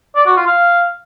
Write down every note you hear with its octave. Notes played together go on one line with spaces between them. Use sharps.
D5
F#4
F4
F5